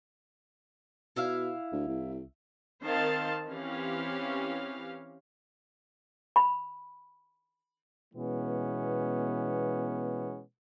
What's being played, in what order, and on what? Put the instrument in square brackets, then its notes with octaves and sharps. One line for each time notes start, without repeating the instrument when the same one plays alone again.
[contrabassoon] B2 [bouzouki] E4 E5 F5
[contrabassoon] D2
C2
[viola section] D#3 C4 C5 F5 A5
E3 C4 C#4 G4 F5
[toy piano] B5
[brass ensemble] B2 E3 G#3 B3 C#4